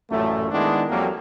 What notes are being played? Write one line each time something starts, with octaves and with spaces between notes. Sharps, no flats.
A1 F#2 A#2 A3
D#3 G#3 B3 D4 E4
F2 F#3 G3 A#3